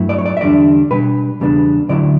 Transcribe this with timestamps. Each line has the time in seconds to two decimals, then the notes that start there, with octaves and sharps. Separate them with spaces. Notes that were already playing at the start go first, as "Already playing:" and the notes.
Already playing: G2 F#3 A3 E4
0.09 D5
0.18 C#5
0.26 D5
0.37 E5
0.41 E2 D3 G3 D4 D5
0.90 B2 G3 D4 B4
1.40 E2 C#3 G3 B3 D4
1.89 D2 D3 F#3 C#4 E4 D5